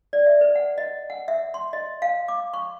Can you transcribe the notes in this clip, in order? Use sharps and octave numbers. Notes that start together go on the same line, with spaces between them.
D5
E5
B4
F#5
D#5
F#5
E5
C6
D#5
F5
D6
C#6